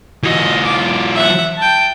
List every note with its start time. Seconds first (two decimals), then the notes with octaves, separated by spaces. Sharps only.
0.23 E3 F#3 D#5
0.65 F4 D6
1.15 E5 F#5
1.57 G5 A5